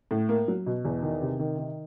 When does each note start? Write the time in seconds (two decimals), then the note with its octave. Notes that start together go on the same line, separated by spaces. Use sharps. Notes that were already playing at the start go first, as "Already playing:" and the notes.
0.11 A2
0.29 A#3
0.48 F#3
0.66 B2
0.85 E2
1.03 D#3
1.22 C3
1.39 D#3
1.58 D#3